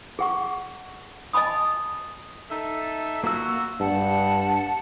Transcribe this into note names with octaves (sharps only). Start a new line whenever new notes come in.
G#4 F#5 C#6
D#5 G#5 A5 B5 D#6
D#4 A4 E5
A#3 F4 F#4 E6
G2 F#5 A5